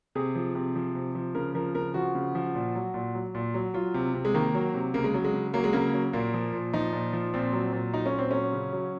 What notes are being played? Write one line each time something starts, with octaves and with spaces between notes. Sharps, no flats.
C3 G#4
F3
C3
F3
C3
F3
C#3 A#4
F3 A#4
C#3 A#4
F3 F#4
C#3
F3
A#2
F#3
A#2
F#3
A#2
F#3
F#3 F4
C3
C3
G#3
D#3 A#3
F#3
C3
C#3 A#3
G#3
F#3
G#3
C#3
F#3 A#3
G#3
C#3 A#3
F#3
A#2 A#3
F3
A#2
F3 D#4
A#2
F3
A#2 C4
F#3
A#2
F#3 D#4
C#4
A#2
C4
F#3 C#4
C#3
F#3